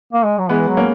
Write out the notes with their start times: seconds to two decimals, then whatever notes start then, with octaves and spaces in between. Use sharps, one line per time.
0.13 A#3
0.25 G#3
0.38 F#3
0.49 E3 G#3 B3
0.68 F#3
0.77 A#3 C#4